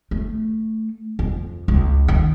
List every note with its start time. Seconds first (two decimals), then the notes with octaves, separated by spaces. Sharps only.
0.11 A3
1.19 F2
1.68 C#2
2.08 D#3